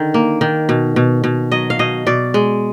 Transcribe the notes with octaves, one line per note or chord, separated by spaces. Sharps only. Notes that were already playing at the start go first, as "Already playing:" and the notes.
Already playing: D3 D#3
A#3
D#3
B2
B2
B2
F#3 D#5
F5
B2 D#5
B2 D5
G#3